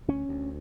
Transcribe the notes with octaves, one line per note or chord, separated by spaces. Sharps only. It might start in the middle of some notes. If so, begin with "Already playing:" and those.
D2 C#4
D2